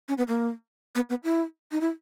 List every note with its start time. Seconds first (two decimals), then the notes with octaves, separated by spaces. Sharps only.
0.09 C#4
0.18 B3
0.28 A#3
0.95 B3
1.10 B3
1.24 E4
1.72 D#4
1.81 E4